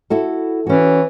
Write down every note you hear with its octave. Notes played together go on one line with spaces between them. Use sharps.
E4 F#4 A4
E3 C#4 F#4